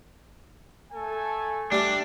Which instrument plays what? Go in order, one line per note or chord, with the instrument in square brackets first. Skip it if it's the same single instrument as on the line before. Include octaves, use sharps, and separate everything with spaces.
[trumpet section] A3 A4 G#5
[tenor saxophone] G3 [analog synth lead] A3 [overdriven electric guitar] D4 [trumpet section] G4